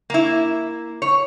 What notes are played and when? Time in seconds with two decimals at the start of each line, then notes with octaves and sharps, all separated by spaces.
0.10 A#3 E4
1.02 C#5